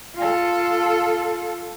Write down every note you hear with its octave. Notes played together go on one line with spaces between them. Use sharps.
F4 A4